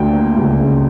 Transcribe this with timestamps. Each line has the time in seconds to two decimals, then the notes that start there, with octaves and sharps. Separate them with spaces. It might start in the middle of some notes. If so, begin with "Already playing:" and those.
Already playing: D2 G5
0.13 A#3
0.36 C#2
0.59 C#3